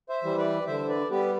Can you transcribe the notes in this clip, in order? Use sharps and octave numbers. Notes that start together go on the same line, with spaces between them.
C5 E5
E3 G3
B4 D5
D3 C5 E5
B4 D5
G3 B3 G4 B4